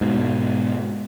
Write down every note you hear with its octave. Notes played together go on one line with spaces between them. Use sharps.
G#2 B2